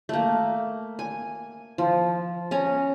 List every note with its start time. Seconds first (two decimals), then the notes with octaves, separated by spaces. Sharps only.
0.09 A3 A#3
0.99 G#5
1.78 F3
2.51 C#4 G#5 A#5